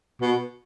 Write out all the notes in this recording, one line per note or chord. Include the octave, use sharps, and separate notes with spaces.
B2